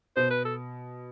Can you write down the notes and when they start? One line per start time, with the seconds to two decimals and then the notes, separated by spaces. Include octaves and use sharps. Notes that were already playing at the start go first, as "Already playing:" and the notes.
0.16 B2 C5
0.30 B4
0.45 A4